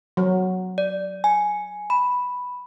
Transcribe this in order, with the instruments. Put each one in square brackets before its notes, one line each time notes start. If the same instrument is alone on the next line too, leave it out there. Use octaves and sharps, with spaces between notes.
[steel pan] F#3
[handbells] D5
G#5
B5